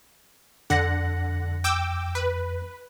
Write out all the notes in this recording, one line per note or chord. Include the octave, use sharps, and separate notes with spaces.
F2 D3 F#5 A#6
G5 D6 E6
B4